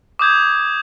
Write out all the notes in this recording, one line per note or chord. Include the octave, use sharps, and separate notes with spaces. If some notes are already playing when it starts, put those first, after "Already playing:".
D6 D#6 G6 G#6